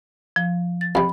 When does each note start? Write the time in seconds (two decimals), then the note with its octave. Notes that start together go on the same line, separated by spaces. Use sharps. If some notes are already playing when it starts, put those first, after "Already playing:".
0.36 F3
0.81 A6
0.95 F2 C3 B5